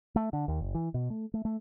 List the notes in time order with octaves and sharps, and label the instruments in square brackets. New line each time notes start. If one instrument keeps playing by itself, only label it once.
[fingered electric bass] A3
D3
D#2
F#1
E3
B2
A3
A3
A3